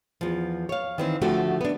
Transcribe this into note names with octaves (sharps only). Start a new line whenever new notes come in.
E2 F3
C#5 F5
D#3 E3 C4
D3 F3 A3 F#4 G4
B3 D4